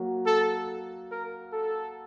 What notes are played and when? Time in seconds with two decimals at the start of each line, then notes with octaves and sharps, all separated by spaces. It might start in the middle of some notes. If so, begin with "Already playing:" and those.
Already playing: F#3 A#3 F#4
0.25 A4
1.11 A#4
1.52 A4